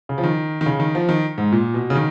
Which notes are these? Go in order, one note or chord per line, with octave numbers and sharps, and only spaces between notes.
C#3
F3
D#3
D#3
C#3
D#3
F3
D#3
G#2
A#2
B2
C#3
D#3